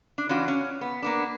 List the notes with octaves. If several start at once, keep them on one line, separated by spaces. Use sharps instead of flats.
D4
E3 C#4 D4 F4 F#4
C#4
B3
A#3 B3 D4